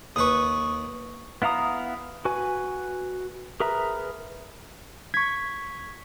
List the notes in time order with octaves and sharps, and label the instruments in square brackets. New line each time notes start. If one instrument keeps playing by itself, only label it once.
[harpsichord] D#2 B4 [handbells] C#6 D#6
[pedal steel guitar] B3 E4 F5 A#5 D#6
F#4 B4 G#5
G#4 A#4 B4 E5 A#5
[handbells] C#6 B6 [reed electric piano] G#6